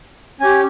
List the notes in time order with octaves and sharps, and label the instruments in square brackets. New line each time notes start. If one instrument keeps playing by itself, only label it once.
[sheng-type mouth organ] C#4 G4 G#5